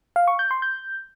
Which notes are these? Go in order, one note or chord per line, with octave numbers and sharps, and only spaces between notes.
F5
C#6
G6
C6
G6